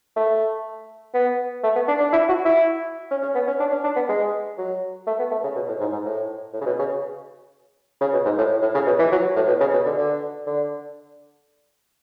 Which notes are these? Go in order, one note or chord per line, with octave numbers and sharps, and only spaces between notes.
A3
B3
A3
B3
D4
D4
E4
F#4
E4
C#4
C#4
B3
C#4
D4
C#4
D4
B3
G#3
F#3
A3
B3
A3
C#3
B2
A2
G#2
G#2
A2
A2
C#3
B2
C#3
C#3
B2
G#2
A2
A2
C#3
B2
E3
F#3
A2
B2
C#3
B2
D3
D3
D3